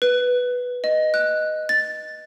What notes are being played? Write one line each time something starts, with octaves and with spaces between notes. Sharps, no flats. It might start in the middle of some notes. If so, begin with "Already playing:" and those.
B4
D#5
F#6
A6